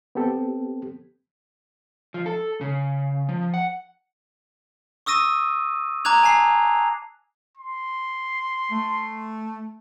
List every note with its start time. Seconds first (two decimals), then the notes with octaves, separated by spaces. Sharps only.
0.15 B3 C4 G4 A4
2.14 F3
2.26 A4
2.61 C#3
3.29 F3
3.54 F#5
5.06 C#6 D#6 E6 A#6 D#7
6.05 A#5 D6 F#6 G#6 F7
6.23 G#5 A5 C7
7.58 C6
8.71 A3